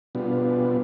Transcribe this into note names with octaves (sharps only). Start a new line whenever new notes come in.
B2 G3 B3 D4 F4